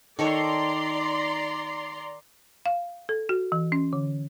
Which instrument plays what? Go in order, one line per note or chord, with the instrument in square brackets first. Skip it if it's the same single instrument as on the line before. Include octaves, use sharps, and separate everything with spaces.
[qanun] D#3 A4 C#5 [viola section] D5 A#5 C6
[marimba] F5
A4
F#4
E3
C#4
D3